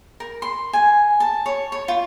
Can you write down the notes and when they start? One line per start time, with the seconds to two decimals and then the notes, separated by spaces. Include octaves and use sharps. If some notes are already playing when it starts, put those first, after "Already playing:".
0.20 A#4
0.42 C6
0.73 G#5
1.20 A5
1.46 C#5
1.72 C#5
1.88 F4